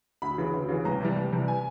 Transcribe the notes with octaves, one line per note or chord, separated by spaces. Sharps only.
D2 B5
C#3 E3
D2
C#3 E3
C2 A#5
C3 E3 G3
C2
C3 E3 G3
G#5